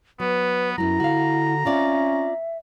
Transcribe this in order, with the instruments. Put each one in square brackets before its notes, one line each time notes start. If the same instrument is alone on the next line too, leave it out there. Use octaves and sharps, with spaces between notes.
[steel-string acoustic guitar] F#3 [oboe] B3 [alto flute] B4
[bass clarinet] F#2 [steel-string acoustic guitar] F#3 B3 [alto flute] E4 [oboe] A#5
[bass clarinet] D3 [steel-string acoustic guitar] F#4 F5
[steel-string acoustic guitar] C4 F4 D5 [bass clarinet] C#4 [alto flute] E5